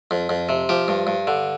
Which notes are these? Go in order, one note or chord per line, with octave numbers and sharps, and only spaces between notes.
F2
F2
C3
F3 G4
G2
G2
D3